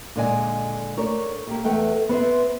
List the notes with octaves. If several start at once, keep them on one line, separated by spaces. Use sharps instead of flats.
A#2 D3 G#3 D5 D#5 G#5
A3 A#4 C#5 D5
A#3 G4 A4
E2 E3 A3 A4 F#5 G5
B3 C4 C5 E5